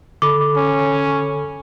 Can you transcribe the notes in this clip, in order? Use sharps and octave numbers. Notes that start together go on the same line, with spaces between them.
D3 A4 B5 D6
C#4